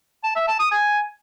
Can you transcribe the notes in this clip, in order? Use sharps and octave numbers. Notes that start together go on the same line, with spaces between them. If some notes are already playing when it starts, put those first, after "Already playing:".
A5
E5
A5
D#6
G#5